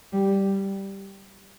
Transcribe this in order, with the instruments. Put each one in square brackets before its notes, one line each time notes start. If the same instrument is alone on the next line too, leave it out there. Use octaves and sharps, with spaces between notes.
[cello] G3